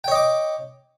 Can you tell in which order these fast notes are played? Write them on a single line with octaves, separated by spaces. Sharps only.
G5 C#5 D#5 D6